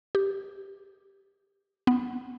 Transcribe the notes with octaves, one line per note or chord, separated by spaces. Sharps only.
G4
B3